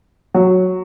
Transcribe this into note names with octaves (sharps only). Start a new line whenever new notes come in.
F#3